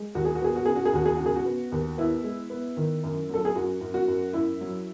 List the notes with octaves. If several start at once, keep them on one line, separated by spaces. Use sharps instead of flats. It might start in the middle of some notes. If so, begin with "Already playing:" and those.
Already playing: G#3
D#2 F#4
G#4
F#4
B3 G#4
F#4
C#3 G#4
F#4
G#4
D#2 F#4
G#4
C#3 F#4
G#4
F#4
B3
D#2
B3 E4
G#3
B3
D#3
F#2
F#3 A4
G#4
F#2 F#4
F#2
F#4
F#2
F#2 E4
F#3